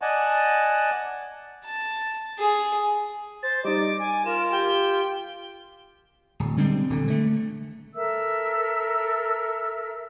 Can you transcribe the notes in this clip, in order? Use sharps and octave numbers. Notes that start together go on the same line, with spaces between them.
D5 D#5 F#5 G#5 A5
A5
G#4
C5 A6
G3 D#4 D#5 D6
G#5
F4 A#4 E7
G4 G5
D1
D3 G3 G#3 C4
D#1 D3
D3 A3
A4 A#4 E5 E6